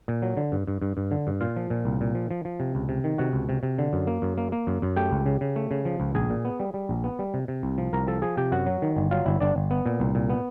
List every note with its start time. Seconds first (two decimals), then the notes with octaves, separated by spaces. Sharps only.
0.08 A#2
0.22 F#3
0.37 D3
0.52 G2
0.67 G2
0.82 G2
0.97 G2
1.11 D3
1.27 G2
1.41 A#2 F4 F5
1.57 F3
1.70 A#2
1.85 C2
2.01 A#2
2.15 F3
2.31 F3
2.45 F3
2.60 C3
2.75 C#2
2.89 C3
3.04 D#3
3.18 C3 F#4 F#5
3.33 C#2
3.49 C3
3.63 C3
3.78 D3
3.93 F#2
4.07 A#3
4.22 F#2
4.38 A#3
4.52 A#3
4.67 F#2
4.82 F#2
4.96 A3 G4 G5
5.11 C#2
5.26 C#3
5.41 C#3
5.56 A3
5.71 C#3
5.85 F3
6.00 C#2
6.15 A#1 G#4 G#5
6.30 A#2
6.45 B3
6.60 G3
6.74 G3
6.89 A#1
7.04 B3
7.19 G3
7.34 C3
7.48 C3
7.63 C2
7.78 F3
7.93 C2 A#4 A#5
8.07 F3 A4 A5
8.22 F3 G#4 G#5
8.37 C3 G4 G5
8.52 F#2 F#4 F#5
8.66 F#3
8.82 D#3
8.96 G1
9.11 F#3 F4 F5
9.26 G1 E4 E5
9.40 G1 D4 D5
9.56 G1
9.71 B3
9.86 A#2
10.00 C2
10.15 A#2
10.30 B3